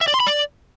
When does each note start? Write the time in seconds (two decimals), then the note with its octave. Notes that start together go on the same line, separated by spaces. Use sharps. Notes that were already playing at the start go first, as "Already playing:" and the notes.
0.01 E5
0.08 D5
0.14 C6
0.20 B5
0.27 D5